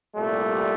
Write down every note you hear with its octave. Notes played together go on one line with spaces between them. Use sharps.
C2 A#2 G3 A3